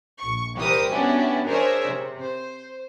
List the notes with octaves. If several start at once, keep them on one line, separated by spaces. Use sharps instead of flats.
A#1 C#6
C2 E3 G4 A#4 C5 D#6
B3 C#4 D4 E4 F#4 G4
D4 G#4 A#4 C5 C#5 E5
C3
C5